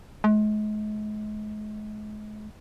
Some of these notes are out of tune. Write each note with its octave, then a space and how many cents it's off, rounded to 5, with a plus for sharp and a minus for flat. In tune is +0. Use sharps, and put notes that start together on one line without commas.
G#3 +40